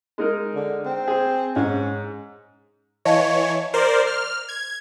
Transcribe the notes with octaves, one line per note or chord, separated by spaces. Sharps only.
G#3 D#4 A#4
D3
C4
G#4 C5
G#2 C#4
E3 C#5 D#5 F5 A5
A#4 C5 D5
F6
G#6